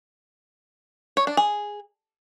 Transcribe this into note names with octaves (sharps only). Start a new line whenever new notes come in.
C#5
D4
G#4